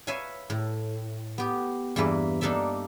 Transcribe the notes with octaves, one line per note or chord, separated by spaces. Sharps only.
B4 C#5 E5 F5 G#5
A2
B3 G4
E2 G2 E3 A#3 E4 B4
A#3 D4 D#4 A4 D5 E5